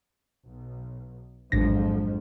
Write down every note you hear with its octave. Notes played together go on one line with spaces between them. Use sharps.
B1
A1 F2 G#2 F3 F#3 G#3 D4 A#6